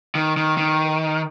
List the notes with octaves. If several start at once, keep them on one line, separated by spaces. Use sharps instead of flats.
D#3
D#3
D#3